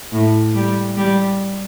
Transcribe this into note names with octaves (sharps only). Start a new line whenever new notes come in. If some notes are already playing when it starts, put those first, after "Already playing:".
A2
G3
G3